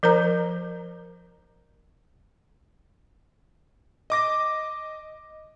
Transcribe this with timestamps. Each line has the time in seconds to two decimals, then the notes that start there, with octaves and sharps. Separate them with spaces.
0.03 F3 A#4 C5 A#5
4.10 D#5 D6 A#6